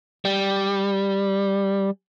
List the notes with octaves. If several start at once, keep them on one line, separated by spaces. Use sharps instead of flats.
G3